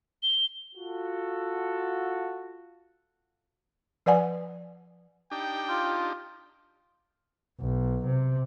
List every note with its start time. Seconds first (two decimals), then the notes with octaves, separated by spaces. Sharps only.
0.23 G7
0.75 F4 F#4 A4
4.06 F3 B4 D5 F#5 G#5
5.32 D4 D#4 G4 G5
5.69 F4
7.60 B1
8.06 C3